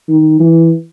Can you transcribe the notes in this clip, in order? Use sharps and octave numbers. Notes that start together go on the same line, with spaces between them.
D#3
E3